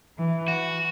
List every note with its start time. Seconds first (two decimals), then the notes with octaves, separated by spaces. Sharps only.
0.19 E3
0.48 F#4